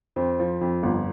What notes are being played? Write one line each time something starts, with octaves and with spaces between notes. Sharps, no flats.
F2 C4
F3
F2
G1